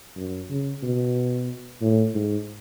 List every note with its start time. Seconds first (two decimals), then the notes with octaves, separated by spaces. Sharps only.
0.17 F#2
0.50 C#3
0.83 B2
1.81 A2
2.15 G#2